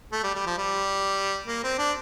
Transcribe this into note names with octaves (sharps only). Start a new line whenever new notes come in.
A3
G3
G3
F3
G3
A#3
C4
D4